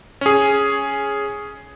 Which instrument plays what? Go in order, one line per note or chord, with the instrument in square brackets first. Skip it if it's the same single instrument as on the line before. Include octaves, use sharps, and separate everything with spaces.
[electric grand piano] C#4 G#4